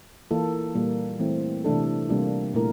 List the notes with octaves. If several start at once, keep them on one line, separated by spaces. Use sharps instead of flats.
E3 A#3 F4 A4
A#2 G3 A#3
E3 A3 C4
C3 E3 A3 D4 A4
C3 G3 A#3 D4 F4
A#2 A3 E4 A#4